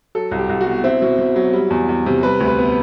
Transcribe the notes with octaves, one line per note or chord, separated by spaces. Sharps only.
F#3 A4
C2
G4
C2
F#4
B2
C4 E4
B2
B2
F#3
G3
E2
E2
C3
G3 B4
D2
B4
B3